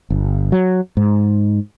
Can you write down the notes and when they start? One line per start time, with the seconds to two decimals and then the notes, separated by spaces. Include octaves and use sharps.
0.10 G1
0.52 F#3
0.97 G#2